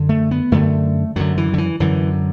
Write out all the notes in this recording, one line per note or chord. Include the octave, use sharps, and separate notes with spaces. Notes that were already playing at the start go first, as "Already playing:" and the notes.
Already playing: F#2 D3
A3
B3
F#2 D3 A3
F#2 D3 F#3
E3
D3
E3
F#2 D3 E3